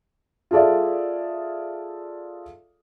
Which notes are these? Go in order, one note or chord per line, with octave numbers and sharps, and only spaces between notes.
F4 G#4 A4 D5 E5